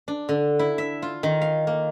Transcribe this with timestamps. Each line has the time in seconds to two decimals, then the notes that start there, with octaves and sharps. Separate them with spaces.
0.08 D4
0.29 D3
0.59 E4
0.78 E5
1.02 F4
1.23 D#3
1.42 F5
1.67 A#3